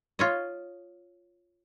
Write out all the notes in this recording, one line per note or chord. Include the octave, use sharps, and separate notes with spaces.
F4 C#5 D#5